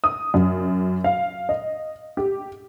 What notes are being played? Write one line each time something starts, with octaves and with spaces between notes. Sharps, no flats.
D#6
F#2
F5
D#5
G4